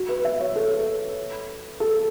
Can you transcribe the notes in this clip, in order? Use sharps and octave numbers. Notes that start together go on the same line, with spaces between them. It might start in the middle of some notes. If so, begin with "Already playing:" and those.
Already playing: F#4
B4
E5
C#5
A4
A4